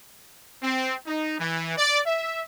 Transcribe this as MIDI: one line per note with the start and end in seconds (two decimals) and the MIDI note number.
0.63 0.95 60
1.07 1.39 63
1.39 1.73 52
1.77 2.00 74
2.06 2.42 76